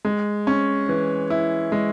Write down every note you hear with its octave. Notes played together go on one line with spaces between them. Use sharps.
G#3
C#4
E3
E4
G#3